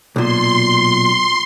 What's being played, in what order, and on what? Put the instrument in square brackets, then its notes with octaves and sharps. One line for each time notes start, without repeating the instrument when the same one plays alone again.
[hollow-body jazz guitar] B1 A#2 [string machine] C6